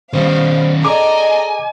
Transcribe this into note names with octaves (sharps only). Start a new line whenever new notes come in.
D#3 G3 B3 C#4 C5 F5
G#4 A4 D5 D#5 G#5 A#5 D6